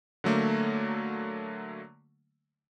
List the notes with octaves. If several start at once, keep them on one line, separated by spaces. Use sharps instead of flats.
D3 F#3 A3 A#3